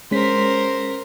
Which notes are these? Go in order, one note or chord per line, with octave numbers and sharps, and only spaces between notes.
G#3 C#4 A#4 C5 B6